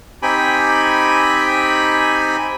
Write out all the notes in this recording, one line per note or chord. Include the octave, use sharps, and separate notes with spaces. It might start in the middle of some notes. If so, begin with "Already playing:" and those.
C4 D#4 G4 G5 G#5 B5